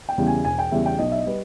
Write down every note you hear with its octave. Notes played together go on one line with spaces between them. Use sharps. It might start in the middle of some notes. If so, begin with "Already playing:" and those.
G5
E2 C#3 G3
G#5
E1 G#5
G5
E2 C#3 G3 E5
G5
B1 D#5
E5
D#5
G3 B4